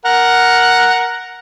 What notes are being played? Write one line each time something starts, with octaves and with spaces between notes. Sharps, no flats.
A#4 F#5